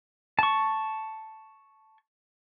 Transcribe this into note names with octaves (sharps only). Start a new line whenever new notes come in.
A5 C#6